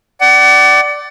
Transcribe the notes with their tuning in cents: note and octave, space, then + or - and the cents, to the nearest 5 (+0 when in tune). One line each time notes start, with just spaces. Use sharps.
D5 +0 F#5 +35